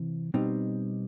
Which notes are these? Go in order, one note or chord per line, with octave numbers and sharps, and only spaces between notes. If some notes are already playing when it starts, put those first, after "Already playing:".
Already playing: C3 E3
B2 G3 C4 D#4